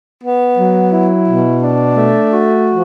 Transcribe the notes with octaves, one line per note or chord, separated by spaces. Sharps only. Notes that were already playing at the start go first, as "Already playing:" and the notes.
B3
F#3
E4
B2
D4
A3
F#4
F3